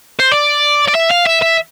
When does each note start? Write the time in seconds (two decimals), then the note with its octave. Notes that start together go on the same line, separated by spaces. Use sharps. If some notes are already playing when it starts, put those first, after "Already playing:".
0.20 C5
0.32 D5
0.88 D5
0.95 E5
1.10 F5
1.26 E5
1.42 E5